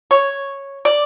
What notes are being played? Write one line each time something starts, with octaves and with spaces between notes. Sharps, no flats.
C#5
D5